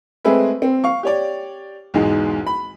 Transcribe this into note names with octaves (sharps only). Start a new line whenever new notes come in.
G#3 A3 C4 G#4 B4 E5
C4
F5 C#6
G4 C#5 D5
B1 E2 G#2 G#3
B5